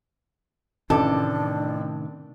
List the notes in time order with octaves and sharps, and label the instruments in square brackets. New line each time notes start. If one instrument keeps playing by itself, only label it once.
[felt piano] A1 D6 [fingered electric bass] A2 C3 D#3 [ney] D4 [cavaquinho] A4